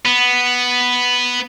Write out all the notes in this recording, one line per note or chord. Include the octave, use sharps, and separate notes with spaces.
B3